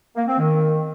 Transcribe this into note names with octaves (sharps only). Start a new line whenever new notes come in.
A#3
C4
D#3